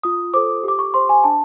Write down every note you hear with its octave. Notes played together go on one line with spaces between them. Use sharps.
F4 D#6
A4 C5 D6
G4 D6
C#6
C5 C6
G#5
D4 A5